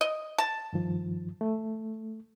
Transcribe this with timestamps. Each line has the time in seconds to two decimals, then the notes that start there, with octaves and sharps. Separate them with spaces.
0.01 D#5
0.38 A5
0.73 G2 D#3 F3
1.41 A3